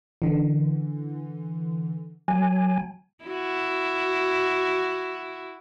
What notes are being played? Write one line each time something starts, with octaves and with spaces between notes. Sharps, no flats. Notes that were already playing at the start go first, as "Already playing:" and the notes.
D3 E3
F#3 G#5
E4 F#4